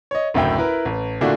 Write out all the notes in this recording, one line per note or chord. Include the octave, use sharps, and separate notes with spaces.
C#5 D#5
F#1 D2 A2 E5 G5
E4 A#4 B4
A1
A#2 D3 A3 D4 E4 F#4